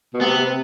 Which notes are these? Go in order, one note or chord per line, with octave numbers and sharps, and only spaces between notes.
B2
C3 B3
C3